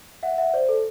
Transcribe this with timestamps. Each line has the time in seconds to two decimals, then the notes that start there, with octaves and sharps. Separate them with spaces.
0.23 E5 F#5
0.38 E5 F#5
0.54 C5 D5
0.69 A4